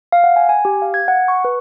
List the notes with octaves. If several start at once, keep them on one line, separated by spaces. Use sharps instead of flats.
F5
F#5
G#5
G#5
G4
F5
G#6
F#5
C#6
B4